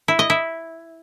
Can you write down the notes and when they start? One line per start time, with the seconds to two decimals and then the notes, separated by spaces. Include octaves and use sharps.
0.08 E4
0.19 D#5
0.30 E4